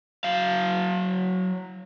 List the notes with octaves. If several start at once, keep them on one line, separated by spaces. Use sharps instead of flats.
F#3 F5